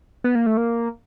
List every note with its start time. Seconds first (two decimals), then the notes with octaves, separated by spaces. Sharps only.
0.24 B3
0.35 A#3
0.46 A3
0.57 A#3